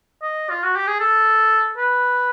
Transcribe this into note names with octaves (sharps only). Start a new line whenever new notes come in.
D#5
F4
F#4
G4
G#4
A4
B4